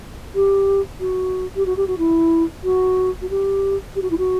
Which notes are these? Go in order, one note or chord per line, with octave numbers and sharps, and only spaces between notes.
G4
F#4
G4
F#4
G4
F#4
E4
F#4
F#4
G4
G4
F#4
E4
F#4